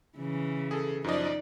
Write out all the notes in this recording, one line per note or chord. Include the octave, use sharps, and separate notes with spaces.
C#3 E3
G#4 A4
F#2 F3 D#4 D5 D#5